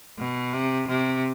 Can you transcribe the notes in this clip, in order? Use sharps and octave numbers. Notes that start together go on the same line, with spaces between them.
B2
C3
C3